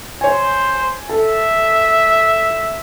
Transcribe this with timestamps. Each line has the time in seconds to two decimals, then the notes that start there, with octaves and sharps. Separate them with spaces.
0.21 C5 C#5 G#5
1.09 A4 E5